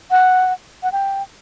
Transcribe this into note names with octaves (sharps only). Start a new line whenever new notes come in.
F#5
F#5
G5